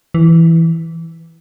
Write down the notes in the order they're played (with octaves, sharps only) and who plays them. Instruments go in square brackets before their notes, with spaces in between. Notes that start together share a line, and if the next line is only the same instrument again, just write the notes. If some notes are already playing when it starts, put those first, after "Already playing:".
[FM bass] E3